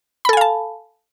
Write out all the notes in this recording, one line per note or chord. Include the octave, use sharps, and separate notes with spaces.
A4 F5 G#5 A5 B5